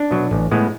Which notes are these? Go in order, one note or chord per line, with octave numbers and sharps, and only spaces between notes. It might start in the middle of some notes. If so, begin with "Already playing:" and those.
Already playing: D4
B2 F#3
A1
A2 G#3 B3